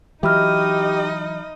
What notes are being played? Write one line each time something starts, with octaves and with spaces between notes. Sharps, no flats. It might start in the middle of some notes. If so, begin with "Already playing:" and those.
E3 F#3 D#4 G4 D#5 E5 B5 F6